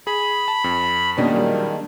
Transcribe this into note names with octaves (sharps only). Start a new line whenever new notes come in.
G#4 B5
A5
F2
B2 D#3 G#3 A#3 C#4 D4
A#2 F#3 G3